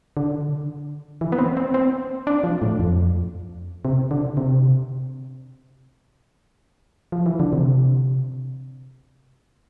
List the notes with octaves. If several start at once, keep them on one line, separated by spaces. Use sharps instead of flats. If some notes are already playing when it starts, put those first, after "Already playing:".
D3
E3
B3
C4
C4
C4
D4
F3
A2
F2
C3
D3
C3
F3
E3
D3
C3